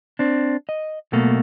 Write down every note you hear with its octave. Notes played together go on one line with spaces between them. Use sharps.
C4 D4
D#5
B1 B2 A3 A#3